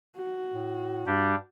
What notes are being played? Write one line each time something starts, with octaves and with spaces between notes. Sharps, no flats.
F#4
A2
G2 G3 D4 G4